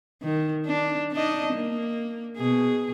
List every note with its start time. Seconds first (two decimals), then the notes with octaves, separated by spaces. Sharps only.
0.22 D#3
0.66 D4
1.12 D4 D#4 D#5
1.53 A#3
2.37 B2 G#4